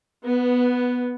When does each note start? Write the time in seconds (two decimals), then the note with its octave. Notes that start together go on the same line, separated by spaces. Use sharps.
0.25 B3